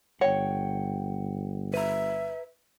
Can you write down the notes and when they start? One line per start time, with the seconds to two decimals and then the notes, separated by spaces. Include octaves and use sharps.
0.21 G1 C#5 F#5 G5
1.74 B4 E5 A#5